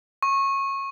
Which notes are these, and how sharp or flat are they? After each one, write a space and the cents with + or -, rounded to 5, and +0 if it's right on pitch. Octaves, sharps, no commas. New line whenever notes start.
C#6 -20